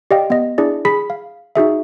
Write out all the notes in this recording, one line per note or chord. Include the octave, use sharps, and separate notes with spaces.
G4 D5 D#5 F5 G5
B3 D#5
D4 E4 G#4 D5
G#4 B5 B6
F5
D#4 F#4 G#4 E5